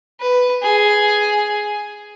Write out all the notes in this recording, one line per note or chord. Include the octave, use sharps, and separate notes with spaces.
B4
G#4